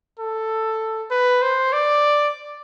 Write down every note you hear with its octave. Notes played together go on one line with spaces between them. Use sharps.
A4
B4
C5
D5